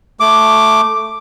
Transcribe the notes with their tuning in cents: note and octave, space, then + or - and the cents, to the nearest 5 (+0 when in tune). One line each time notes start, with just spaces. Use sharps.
A3 +0 D6 +5